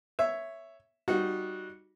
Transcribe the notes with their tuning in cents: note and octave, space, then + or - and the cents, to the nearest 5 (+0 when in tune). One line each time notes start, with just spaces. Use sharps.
C#5 +0 E5 +5
G3 -15 D#4 +0 F#4 -10